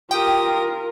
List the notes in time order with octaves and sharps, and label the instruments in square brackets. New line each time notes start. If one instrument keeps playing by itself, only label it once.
[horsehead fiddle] F4 A#4 [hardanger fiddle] G4 D#6 [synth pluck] G5